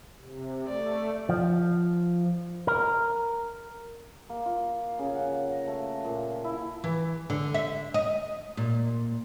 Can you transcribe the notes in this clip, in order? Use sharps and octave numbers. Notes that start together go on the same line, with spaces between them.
C3
A3 D5
F3
A#4
A#3
F4
C#3
F#5
A#5
A3
A5
A#2
E4
E3
D3
E5
D#5
A#2